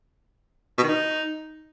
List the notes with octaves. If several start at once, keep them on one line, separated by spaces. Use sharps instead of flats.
B2
D#3
D#4